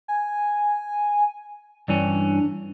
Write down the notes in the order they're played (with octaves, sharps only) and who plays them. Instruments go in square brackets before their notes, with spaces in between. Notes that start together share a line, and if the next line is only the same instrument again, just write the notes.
[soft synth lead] G#5
[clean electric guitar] G2 E3 C#4 [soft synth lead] D4